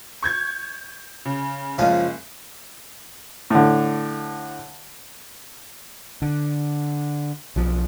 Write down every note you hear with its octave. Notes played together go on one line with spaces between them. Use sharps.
C#6 G6 G#6
C#3
F#1 F3 G#3 C#4 F5
A2 D3
D3
B1 F3